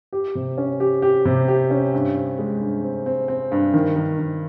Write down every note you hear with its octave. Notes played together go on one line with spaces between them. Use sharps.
G4
C3
C#4
G4
G4
C3
G4
C#4
G2
C4
G#3
G2
C4
C4
C4
G2
D#3
D#3
D#3